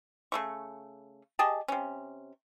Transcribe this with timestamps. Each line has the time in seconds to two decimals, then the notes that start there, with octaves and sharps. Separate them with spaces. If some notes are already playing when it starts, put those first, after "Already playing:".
0.32 C#3 A3 C#6
1.39 G4 G#4 D#5 A5
1.68 C3 C#4